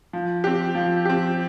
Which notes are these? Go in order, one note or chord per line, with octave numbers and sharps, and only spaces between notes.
F3
C4 G4
F3
C4 G4